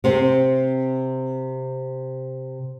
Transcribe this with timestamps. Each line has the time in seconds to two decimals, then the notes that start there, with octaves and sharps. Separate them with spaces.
0.04 C3 C4